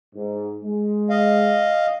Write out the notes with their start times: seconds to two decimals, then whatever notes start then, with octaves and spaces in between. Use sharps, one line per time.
0.15 G#2
0.64 G#3
1.10 D#5 F5